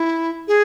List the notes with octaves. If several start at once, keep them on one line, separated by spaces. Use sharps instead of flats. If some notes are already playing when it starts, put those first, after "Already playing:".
Already playing: E4
G#4